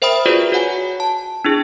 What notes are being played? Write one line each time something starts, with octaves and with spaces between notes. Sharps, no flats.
A#4 C5 E5 G5 B5 D#6
F4 F#4 G#4 B4 D5
F#4 C#5 F#5 G#5
A5
D4 E4 G#4